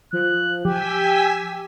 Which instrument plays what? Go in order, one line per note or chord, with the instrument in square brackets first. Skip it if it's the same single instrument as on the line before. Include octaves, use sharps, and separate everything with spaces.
[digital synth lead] F3 [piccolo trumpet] F#6
[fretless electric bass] F3 [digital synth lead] G4 [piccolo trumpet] G5 [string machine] G#5 E6 B6